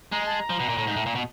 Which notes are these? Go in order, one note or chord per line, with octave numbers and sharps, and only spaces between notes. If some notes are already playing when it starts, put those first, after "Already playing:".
G#3 A#5
A5
A#5
F3
B2
A#2
A2
G#2
A2
A#2
B2